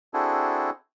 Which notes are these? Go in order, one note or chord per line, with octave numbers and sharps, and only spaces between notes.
C4 D4 E4 F#4 G#4 A4